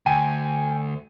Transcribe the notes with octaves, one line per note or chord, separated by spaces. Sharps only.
D2 G5 G#5 D#7